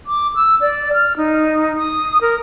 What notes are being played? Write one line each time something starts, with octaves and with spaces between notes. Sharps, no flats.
D6
E6
D5
F6
D#4
D#6
A#4